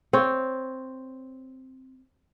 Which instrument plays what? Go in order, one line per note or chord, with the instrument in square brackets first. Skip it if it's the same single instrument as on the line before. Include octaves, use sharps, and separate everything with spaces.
[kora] C4 C#5